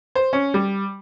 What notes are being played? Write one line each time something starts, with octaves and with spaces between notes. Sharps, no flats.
C5
C#4
G3